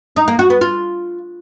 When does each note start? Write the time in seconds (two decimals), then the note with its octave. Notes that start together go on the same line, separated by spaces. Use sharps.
0.16 D#4
0.28 A#3
0.39 F#4
0.50 B3
0.61 F4